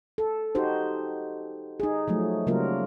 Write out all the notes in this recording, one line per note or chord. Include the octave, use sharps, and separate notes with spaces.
A4
D#4 F#4 G4 C5
D#4 G#4
F3 F#3 A3
C#3 F#3 G3 A#3 F4 A#4